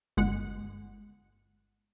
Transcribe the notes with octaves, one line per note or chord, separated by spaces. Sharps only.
G1 G#3 F#5